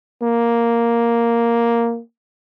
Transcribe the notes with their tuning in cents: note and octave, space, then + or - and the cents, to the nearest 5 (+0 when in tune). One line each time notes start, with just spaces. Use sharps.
A#3 +0